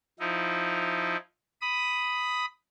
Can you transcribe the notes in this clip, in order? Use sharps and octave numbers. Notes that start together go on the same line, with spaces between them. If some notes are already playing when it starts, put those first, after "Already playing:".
F3 D#4 E4
B5 D#6